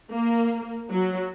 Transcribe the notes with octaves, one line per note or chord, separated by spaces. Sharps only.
A#3
F#3